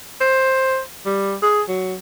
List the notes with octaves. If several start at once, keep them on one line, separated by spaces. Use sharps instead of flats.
C5
G3
G#4
F#3